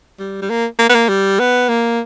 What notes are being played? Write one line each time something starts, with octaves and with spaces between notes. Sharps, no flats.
G3
G3
A#3
A#3
B3
A#3
G3
B3
A#3